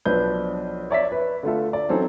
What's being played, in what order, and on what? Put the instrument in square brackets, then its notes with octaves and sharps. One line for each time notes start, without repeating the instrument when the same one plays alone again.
[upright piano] B1 F3 D4 B4 G6
C#5 D5 E5 B6
B4
D3 A3 F4 A4
D5
E3 F#3 C4 C#4 D#4 A4